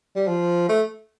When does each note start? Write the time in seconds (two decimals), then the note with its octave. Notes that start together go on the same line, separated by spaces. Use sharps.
0.16 G3
0.27 F3
0.69 A3